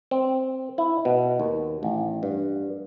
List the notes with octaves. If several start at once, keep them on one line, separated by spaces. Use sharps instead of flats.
C4
E4
B2
D#2
A1
G2